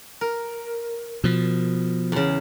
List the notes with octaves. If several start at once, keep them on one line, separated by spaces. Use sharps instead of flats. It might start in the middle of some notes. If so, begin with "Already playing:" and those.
A#4
B2 F3
E2 C#3